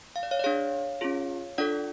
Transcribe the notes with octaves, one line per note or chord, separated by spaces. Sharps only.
F5
D5
C#5 F5
D5
D4 G#4 C#5 F5
C#4 F4 G#4
D4 F4 A4 D5 F#5